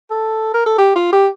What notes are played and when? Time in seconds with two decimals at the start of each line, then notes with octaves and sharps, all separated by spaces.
0.10 A4
0.54 A#4
0.66 A4
0.78 G4
0.95 F4
1.12 G4